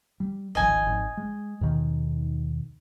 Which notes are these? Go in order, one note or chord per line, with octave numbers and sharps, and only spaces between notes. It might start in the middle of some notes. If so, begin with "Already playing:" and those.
G3
D1 G#1 F3 D#5 G#5
G#1
G#3
D#2 B2 D#3